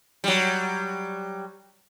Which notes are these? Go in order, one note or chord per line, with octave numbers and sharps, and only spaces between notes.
F#3 G3